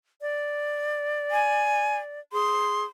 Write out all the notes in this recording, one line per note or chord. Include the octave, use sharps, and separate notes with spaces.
D5
G#5
G#4 C6